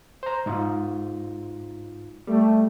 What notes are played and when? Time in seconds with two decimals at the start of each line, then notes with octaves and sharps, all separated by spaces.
0.23 C5 A#5
0.46 G#2 D#4 F4
2.27 G3 A3